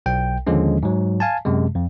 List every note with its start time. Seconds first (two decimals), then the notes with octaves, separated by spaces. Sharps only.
0.06 B1 G5
0.47 D#2 D3 F3 G#3 C#4
0.83 G#2 F#3
1.20 F5 G#5 A5
1.45 F#2 C3 G#3
1.75 F2